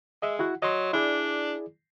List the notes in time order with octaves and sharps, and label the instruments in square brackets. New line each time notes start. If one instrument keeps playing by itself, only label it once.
[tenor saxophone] G#3 [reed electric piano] D#5 E5
[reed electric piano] E4 F#4 F#5
[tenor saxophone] F#3 [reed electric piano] D#5 C6
[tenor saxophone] D4 [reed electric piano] E4 G#4 D5